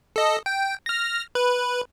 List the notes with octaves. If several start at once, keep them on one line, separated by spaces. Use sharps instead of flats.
A4 D#5
G5
F6 A#6
B4